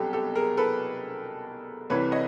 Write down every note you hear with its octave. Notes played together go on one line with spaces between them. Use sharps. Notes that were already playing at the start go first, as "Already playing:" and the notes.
Already playing: C2 B2 F#3 G4 A4
G4 A4
G#4 A#4
A4 B4
C2 C3 E3 B4 C#5
C#5 D#5